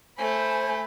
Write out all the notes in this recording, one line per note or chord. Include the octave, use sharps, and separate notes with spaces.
A3 C5 G#5 B5